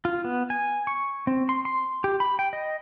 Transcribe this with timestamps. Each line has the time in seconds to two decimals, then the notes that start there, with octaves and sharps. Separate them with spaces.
0.05 F4
0.24 B3
0.50 G#5
0.87 C#6
1.27 C4
1.49 C6
1.65 C6
2.04 G4
2.20 B5
2.39 G5
2.53 D#5